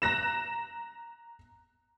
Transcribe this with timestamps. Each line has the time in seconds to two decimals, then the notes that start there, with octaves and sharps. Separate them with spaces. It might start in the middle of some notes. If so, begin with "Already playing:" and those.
0.02 A#5 F#6 A#6 E7